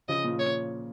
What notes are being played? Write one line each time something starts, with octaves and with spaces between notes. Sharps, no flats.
C#3 F3 D#5
A#2
C#5